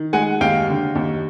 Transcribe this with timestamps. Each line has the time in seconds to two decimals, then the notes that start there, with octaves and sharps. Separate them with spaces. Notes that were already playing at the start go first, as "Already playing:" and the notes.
Already playing: D#3
0.13 G#3 F#5 G#5
0.41 D#2 F5 G5
0.69 D3
0.95 D#2